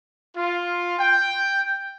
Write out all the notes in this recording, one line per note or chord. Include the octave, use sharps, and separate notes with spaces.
F4
G5